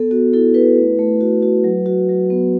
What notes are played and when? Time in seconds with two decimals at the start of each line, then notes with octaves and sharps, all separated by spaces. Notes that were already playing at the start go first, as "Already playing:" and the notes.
Already playing: B3 A4
0.11 B3 F#4
0.33 E4 A4
0.54 E4 B4
0.77 A3
0.99 A3
1.21 F#4
1.43 F#4
1.64 F#3
1.86 F#4
2.09 F#3
2.30 B3